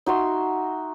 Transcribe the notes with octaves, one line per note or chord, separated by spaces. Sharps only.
D#4 F#4 E5 C6